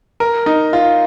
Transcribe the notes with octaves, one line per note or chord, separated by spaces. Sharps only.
A#4
D#4
F4